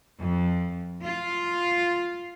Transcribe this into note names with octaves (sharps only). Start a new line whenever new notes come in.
F2
F4